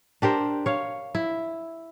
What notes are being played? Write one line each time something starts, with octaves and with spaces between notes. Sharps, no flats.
D4 G4 A#4 C5
C#5 F5
E4